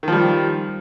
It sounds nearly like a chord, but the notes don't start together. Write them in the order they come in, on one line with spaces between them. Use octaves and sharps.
D#3 F3 G3